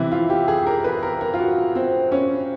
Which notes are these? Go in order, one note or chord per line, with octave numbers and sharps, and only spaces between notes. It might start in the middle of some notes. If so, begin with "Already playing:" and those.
Already playing: C3 E3 E4
F4
G4
G#4
A#4
B4
A#4
A#4
F4
F#4
C4
C#4